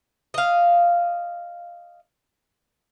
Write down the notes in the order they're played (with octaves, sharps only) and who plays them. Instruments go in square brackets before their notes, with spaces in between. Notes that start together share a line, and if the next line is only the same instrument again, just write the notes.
[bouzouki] D#5 F5